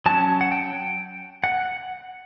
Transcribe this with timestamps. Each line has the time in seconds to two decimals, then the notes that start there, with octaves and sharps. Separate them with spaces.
0.06 F#3 C#4 A5
0.41 F#5
0.52 G5
1.44 F#5